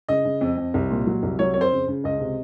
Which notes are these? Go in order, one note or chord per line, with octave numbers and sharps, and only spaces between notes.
C#3 D#5
C#3
F2
F2
C2
A#2
F#3
C2
F#3 C#5
F2 C#5
C5
C#3
C#3
C#2 D#5
C3